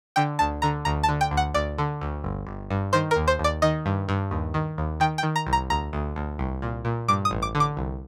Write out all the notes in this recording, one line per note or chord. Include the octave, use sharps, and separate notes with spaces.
D3 G5
D2 A5
D3 A#5
D2 A#5
A5
D3
G5
D2
F#5
D2 D5
D3
D2
G1
G1
G2
D#3 C5
A#4
D#2
C5
D#2 D5
D#3 D#5
G2
G2
D#2
D#3
D#2
D#3 G5
G5
D#3
A#5
C2
A#5
D2 A#5
D2
D2
C2
A#2
A#2
G2 D6
D#6
A1
D6
D3
D6
C2